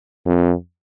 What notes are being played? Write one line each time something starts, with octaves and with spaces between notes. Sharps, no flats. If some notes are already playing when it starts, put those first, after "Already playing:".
F2